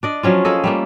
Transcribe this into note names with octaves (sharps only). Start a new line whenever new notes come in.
D4 D5 D#5
F3 F#3 C#4 F4
A#3 G#4 A4 D#5
G3 A3 A#3